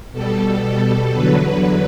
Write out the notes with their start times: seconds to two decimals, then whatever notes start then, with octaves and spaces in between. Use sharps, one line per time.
0.12 B2 G3 A4
0.62 A4
1.12 E2 D3 F#3 B4